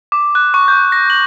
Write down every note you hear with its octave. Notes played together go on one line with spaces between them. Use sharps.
D6
F#6
C#6
G6
A#6
F#7